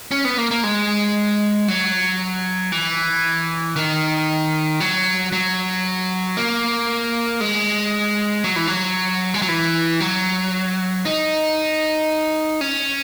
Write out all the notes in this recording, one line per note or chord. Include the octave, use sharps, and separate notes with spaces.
C#4
B3
A#3
A#3
G#3
F#3
E3
D#3
F#3
F#3
A#3
G#3
F#3
E3
F#3
G#3
F#3
E3
F#3
D#4
C#4